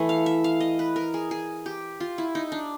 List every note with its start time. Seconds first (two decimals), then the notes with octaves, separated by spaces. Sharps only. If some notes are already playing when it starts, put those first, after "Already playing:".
Already playing: E3 A3
0.09 F5
0.26 E5
0.44 F5
0.61 D#5
0.79 B4
0.96 A#4
1.14 G#4
1.31 G#4
1.66 G4
2.00 F4
2.18 E4
2.35 D#4
2.52 D4